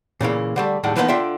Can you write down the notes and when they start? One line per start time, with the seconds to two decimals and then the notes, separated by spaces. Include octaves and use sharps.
0.21 A#2 C#3 E3 A#3
0.56 D3 G3 A3
0.84 D#2 A2 G3 G#3 F#5
0.96 E3 F3 A#3 B3 C#4 D#4
1.08 D3 F4 E5 G5